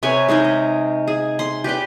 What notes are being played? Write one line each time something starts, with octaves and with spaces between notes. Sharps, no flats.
C3 B4 C#5 G#5
G#3 D#4 G#4 A#4
D#5
G#4
C6
G4 B4 D5 G5